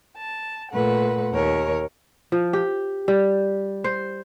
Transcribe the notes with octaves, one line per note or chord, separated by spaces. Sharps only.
A5
A#2 A3 B4 F#5
D#2 A#4 C#5
F3
G4
G3
C5